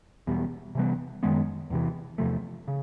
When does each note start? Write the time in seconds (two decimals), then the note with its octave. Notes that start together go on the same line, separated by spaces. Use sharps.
0.27 E2 B2 G3
0.75 C3 E3 G3 B3
1.23 F#2 D#3 G#3 B3
1.70 E2 C3 E3
2.18 E2 C3 F3 A3
2.68 C#3